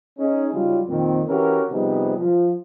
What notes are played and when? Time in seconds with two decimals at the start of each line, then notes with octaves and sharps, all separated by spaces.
0.18 C#4 D#4 G#4
0.52 C#3 F#3 G3 D#4 F4
0.88 F2 A#2 D#3 C4
1.28 E3 C#4 F#4 G4 A#4
1.71 C3 F3 G3 B3 D#4 G#4
2.17 F3